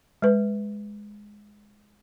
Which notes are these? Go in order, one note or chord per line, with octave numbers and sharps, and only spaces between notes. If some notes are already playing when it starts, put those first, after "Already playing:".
G#3 B4